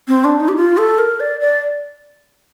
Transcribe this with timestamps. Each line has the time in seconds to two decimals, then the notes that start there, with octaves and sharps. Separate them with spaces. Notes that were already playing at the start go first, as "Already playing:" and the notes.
0.08 C4
0.25 D4
0.40 D#4
0.48 G4
0.56 F4
0.78 A4
0.98 A#4
1.20 D5
1.40 D5